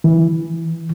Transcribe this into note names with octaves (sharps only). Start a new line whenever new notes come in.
E3